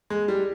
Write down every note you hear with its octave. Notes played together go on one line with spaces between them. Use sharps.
G#3
G3